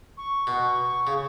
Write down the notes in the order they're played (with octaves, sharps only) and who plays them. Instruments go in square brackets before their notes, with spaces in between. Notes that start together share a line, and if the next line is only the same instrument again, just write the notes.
[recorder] C#6
[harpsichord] B2
C#3